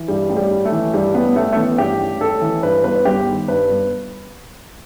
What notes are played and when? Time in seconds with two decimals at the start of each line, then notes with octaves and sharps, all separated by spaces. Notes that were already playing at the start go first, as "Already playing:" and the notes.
Already playing: E3
0.08 G2 G3
0.29 A1
0.36 G3
0.50 A1
0.65 A3
0.72 E3
0.93 G2 G3
1.14 A1 B3
1.36 A1 A3
1.52 A3
1.57 E3 B3
1.78 G2 G4
2.00 A1
2.21 A1 A4
2.42 E3
2.63 G2 B4
2.84 G1 B4
3.05 G1 G4
3.27 D#3
3.48 G2 B4
3.69 G1